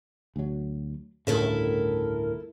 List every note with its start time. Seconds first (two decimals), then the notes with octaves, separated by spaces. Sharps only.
0.36 D2 F#3
1.27 G1 D2 A2 C#3 E4 A4 A#4 E5